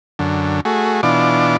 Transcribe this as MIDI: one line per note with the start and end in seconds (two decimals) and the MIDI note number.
0.19 0.61 42
0.19 0.61 50
0.65 1.01 57
0.65 1.01 66
0.65 1.01 68
1.03 1.57 47
1.03 1.57 52
1.03 1.57 62
1.03 1.57 65
1.03 1.57 86